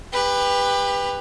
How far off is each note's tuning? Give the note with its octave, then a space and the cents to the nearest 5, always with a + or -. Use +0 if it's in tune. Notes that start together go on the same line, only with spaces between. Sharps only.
G4 +30 B4 +0